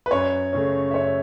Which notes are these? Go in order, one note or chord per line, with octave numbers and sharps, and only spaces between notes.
B4
F#2 C#5
C#3 A3 C#4
E5
F#2 C#5